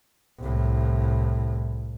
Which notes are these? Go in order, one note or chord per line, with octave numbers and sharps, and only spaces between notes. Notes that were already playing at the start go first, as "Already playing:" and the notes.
C2 A2